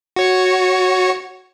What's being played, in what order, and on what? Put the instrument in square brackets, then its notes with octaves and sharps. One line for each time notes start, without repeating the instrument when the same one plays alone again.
[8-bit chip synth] F#4 C#5 C#7